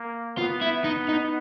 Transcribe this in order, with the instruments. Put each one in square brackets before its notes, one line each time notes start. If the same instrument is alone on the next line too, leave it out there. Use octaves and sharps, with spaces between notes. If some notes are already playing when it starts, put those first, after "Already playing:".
Already playing: [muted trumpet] A#3
[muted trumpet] B3 [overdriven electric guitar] F4
[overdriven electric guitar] E4
D#4
D#4